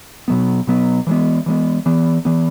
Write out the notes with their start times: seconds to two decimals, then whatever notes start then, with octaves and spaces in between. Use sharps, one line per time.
0.28 B2 F#3 B3
0.67 B2 F#3 B3
1.07 E3 G#3 B3
1.46 E3 G#3 B3
1.86 E3 B3
2.25 E3 B3